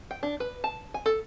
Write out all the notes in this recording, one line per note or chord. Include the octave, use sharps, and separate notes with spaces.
G5
D4
B4
A5
G#5
A4